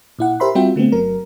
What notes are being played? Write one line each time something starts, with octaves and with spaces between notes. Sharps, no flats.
A#2 E4 F#5
G4 A#4 C5 E5 B5 C6
G3 C4 F4 F#4 E5 G5
D3 A3 B3 C4
G1 F#3 A#4